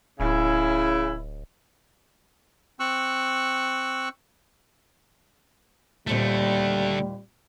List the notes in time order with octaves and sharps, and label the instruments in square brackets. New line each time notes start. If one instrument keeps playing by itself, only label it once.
[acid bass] D1 [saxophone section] C#3 E4
[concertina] C4 C#6 E6 F#6
[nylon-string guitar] D#2 A#2 C4 [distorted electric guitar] D3 A3 [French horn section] G3